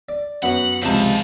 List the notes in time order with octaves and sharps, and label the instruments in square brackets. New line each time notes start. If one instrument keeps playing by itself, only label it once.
[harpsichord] D5
[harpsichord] F#2 B3 C#6 [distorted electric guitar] F#5
[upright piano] C#2 C3 [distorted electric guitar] D#3 A5 [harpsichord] F3